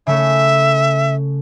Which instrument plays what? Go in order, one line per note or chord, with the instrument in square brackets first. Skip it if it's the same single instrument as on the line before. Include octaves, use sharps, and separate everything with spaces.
[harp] C#3 A3 C#4 [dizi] E5